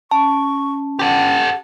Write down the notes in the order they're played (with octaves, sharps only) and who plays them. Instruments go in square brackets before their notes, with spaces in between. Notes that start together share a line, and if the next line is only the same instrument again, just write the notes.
[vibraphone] C#4 [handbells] A5 [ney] C#6
[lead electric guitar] G4 A4 [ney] F#5